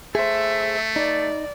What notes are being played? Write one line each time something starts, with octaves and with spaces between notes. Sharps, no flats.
A3 G#4 C5 E5
D#4 D5